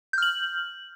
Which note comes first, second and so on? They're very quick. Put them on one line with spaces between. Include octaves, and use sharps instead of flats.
G6 F6 F#7